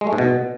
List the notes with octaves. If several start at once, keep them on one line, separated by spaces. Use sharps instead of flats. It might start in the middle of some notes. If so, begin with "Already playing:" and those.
G#3
A3
G#2
B2